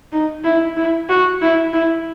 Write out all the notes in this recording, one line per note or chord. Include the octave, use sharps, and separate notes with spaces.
D#4
E4
E4
F#4
E4
E4